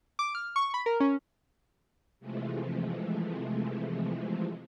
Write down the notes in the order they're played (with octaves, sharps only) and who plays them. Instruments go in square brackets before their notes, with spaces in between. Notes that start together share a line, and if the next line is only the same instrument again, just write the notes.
[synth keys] D6
F6
C#6
B5
A#4
C#4
[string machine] C3 E3 F3 G#3 A3